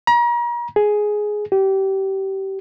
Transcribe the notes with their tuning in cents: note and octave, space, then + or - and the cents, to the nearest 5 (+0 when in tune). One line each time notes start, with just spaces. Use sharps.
A#5 +40
G#4 +5
G4 -25